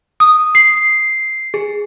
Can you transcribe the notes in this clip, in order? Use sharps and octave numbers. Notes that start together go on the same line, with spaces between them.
D#6
C7
G#4